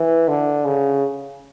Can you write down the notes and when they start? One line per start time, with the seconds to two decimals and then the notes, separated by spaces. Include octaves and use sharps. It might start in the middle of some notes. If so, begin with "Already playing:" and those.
Already playing: E3
0.28 D3
0.65 C#3